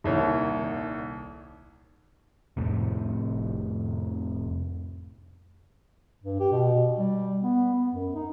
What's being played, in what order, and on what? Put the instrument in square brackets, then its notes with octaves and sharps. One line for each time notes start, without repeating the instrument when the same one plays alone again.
[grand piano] D#1 C2 D#3 C#5
[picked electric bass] F2 A2 C3
[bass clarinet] G2
G4
B2
G3
B3
B3
F#2
D#4